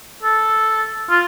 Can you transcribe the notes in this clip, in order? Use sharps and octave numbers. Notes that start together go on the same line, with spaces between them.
A4
F4